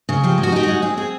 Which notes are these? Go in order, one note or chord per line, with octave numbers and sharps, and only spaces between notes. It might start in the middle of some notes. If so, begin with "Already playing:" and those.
C#3
F3 G4
G#3
F#4
D#4 G4
F#4
G#3
C4 G#4
C4 G#4